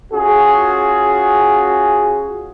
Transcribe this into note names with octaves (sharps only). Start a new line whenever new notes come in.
C#4 F4 F#4 G#4